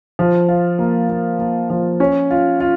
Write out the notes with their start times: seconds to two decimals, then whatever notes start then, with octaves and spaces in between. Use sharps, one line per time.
0.19 F3
0.48 F4
0.79 A#3
1.09 A#3
1.39 A#3
1.70 F3
2.00 C#4
2.31 F4
2.60 F4